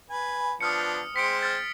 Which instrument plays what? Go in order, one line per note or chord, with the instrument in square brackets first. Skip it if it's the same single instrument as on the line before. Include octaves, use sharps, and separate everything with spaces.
[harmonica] B4 G#5
[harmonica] F3 B3 D4 [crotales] D#6 F6 C#7
[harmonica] G#3 C4 C5 [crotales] B6 C#7 D7
[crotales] F6 A6